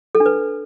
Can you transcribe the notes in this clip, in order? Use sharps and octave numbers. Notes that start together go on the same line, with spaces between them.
A4
D4
B4